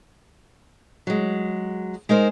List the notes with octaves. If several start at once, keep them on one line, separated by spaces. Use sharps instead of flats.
F#3 G#3
G#3 D#4 A#4 C5